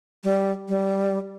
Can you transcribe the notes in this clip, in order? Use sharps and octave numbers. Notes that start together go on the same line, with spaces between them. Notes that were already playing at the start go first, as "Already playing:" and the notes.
G3
G3